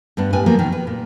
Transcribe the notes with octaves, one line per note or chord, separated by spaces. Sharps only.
G2 B3 D4
A2 G3 B4 G#5
F3 F#3 A#3 B3
B2 D#3
B4
A#2